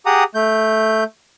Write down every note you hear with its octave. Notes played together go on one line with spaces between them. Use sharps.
G4 G#4 F#5 A#5 D#6
A3 G6